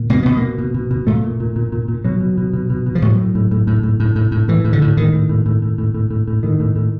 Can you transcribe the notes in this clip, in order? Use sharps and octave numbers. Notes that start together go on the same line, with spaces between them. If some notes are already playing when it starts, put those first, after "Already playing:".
Already playing: A#2
B2 A#3
B2 B3
A#3
B2
B2
B2
B2
A#2 A3
A#2
A#2
A#2
A#2
A#2
B2 F#3
B2
B2
B2
B2
B2
F3
A2 F#3
A2
A2
A2
A2
A2
A2
A2
A2
A2 E3
A2
D3
A2
A2 D#3
A2
A2
A2
A2
A2
A2
A2
A2
A2 D#3
A2
A2